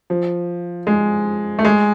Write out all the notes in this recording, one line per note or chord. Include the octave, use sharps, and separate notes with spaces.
F3
G#3
A3
G#3